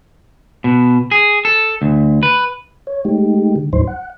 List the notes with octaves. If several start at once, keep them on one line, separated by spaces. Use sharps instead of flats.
B2
G#4
A4
D2
B4
C#5
G#3 A3 D#4 G4
D3
D2 G#2 F#3 D#4 C5 C6
F#5